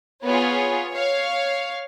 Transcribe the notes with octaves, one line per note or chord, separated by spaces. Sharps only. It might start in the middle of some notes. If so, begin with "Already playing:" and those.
B3 F4 G#4 C#5
C#5 F5